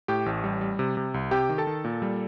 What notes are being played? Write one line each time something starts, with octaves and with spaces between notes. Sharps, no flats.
A2 G4 G5
A1
G3
G3
C3
C3
C2
C3 G4 G5
D#3
A4 A5
D#3
A#2
G3